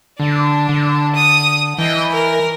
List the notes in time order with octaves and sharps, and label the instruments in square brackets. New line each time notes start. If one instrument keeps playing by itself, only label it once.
[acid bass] D3 [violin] D4
[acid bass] D3
[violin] D#6
[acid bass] E3 [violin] D#5 G5
[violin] A#4